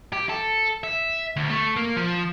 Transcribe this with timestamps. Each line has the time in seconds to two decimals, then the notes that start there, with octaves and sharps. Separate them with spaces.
0.13 G4
0.29 A4
0.84 E5
1.36 D2
1.50 A3
1.76 A#3
1.97 F3